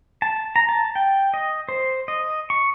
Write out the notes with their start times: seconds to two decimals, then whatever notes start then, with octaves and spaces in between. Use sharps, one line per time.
0.22 A5
0.56 A#5
0.69 A5
0.95 G5
1.34 D#5
1.69 C5
2.08 D#5
2.50 C#6